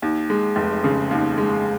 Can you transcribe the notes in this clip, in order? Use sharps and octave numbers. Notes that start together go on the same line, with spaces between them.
D#2
G#3
F1
C#3
D#2
G#3